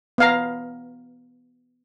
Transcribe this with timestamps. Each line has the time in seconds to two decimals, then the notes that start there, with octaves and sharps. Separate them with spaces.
0.18 B3 F5 A#5